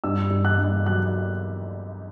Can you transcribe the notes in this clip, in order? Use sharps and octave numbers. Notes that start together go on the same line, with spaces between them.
G2 E6
G2
F#6
G2
F#3 F#6